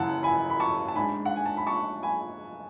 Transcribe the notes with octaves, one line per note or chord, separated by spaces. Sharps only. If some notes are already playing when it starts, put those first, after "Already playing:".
Already playing: F#1 F#2 E3 F#5 A5
G#5 B5
B5
A5 C#6
A5
G#2 G#3 D4 G#5 B5
F#5
G#5
A5
B5
A5 C#6
G#5 B5